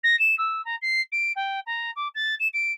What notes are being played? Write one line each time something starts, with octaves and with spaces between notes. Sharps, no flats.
A#6
E7
E6
A#5
C7
D7
G5
A#5
D6
A6
E7
D7